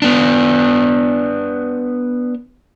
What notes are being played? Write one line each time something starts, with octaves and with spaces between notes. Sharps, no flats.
B3 D4